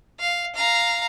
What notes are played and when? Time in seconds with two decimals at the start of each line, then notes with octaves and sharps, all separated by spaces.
0.19 F5
0.55 F5 A#5